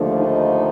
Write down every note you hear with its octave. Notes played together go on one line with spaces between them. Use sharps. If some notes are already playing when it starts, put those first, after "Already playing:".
Already playing: D#2 D3 F3 A3
D#4